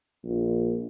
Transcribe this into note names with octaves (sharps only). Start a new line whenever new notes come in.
A#1